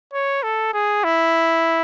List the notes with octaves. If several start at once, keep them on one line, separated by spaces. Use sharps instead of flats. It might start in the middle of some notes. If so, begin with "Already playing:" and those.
C#5
A4
G#4
E4